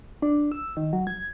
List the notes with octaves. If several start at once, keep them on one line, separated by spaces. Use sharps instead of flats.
D4
E6
D#3
F#3
G#6